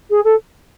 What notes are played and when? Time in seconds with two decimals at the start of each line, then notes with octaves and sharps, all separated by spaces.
0.10 G#4
0.24 A4